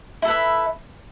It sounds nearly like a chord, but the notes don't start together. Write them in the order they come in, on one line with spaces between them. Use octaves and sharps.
E4 A4 B4 E5